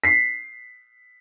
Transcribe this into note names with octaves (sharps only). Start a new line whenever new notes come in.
B6 C7